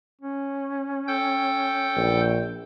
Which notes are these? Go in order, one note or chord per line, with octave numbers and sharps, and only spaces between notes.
C#4
A4 G5 G6
A#1